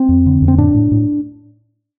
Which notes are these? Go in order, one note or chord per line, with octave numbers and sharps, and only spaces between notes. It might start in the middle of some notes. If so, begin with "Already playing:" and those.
Already playing: C4
F2
D3
F2
C4
A2 D4
A2
A2